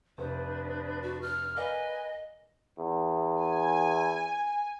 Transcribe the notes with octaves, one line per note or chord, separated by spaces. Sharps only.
F1 D4 B4 C5 D#5
F#4
F6
A#4 B4 D5 D#5 F5 G#5
E2
G#5